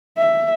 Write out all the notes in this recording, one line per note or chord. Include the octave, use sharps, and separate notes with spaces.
E5